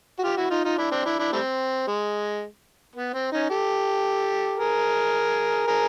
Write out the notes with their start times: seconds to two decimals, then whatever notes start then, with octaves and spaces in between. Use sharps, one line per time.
0.19 F#4
0.24 F4 G4
0.37 E4 F#4
0.50 D#4 F4
0.64 D#4 F4
0.78 D4 E4
0.91 C4 D4
1.05 D4 E4
1.19 D4 E4
1.32 G3 A3 C4
1.87 G#3
2.96 B3
3.14 C4
3.32 C#4 D#4
3.50 G4 A4
4.58 G#4 A#4
5.67 G#4 A#4